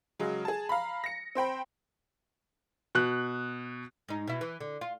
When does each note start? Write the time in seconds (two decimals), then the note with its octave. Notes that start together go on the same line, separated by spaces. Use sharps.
0.19 C#3 F#3 G#3
0.45 G#4 A5
0.69 F5 A#5 B5
1.04 A#6 C#7
1.35 C4 C5 G5 B5
2.95 B2 F#6
4.08 G#2 D#4
4.28 B2 E4
4.41 E3
4.60 D3
4.81 F4